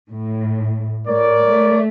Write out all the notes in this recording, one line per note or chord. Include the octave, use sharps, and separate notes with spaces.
A2
A2 A#4 C#5 D5
A3